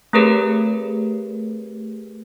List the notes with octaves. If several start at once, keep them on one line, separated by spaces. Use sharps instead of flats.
A3 C4 G4 G#4 A#4 B4